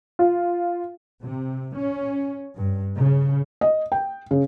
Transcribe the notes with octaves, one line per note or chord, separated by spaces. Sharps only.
F4
C3
C#4
G2
C#3
D#5
G5
C#3